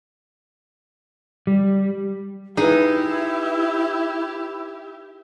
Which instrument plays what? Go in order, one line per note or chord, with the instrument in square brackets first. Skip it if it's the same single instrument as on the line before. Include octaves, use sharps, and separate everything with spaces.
[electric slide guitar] G3
[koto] D#4 [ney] E4 [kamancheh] G4 E5 [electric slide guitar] G#4 B4